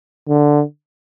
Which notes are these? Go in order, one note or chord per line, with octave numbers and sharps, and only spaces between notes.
D3